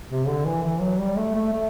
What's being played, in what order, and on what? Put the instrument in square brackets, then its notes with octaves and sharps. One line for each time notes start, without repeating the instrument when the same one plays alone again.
[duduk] C3
D3
E3
E3
F#3
G3
A3
A3
A3